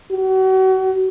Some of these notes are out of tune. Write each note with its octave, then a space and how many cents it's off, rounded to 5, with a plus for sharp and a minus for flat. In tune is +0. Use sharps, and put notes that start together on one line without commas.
F#4 +35